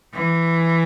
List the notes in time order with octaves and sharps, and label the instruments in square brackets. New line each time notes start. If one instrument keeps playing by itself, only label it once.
[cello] E3